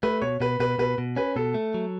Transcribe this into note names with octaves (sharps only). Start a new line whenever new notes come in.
A3 B4
B2 C#5
B2 B4
B2 B4
B2 B4
B2
C#4 B4
B2 A4
A3
F#3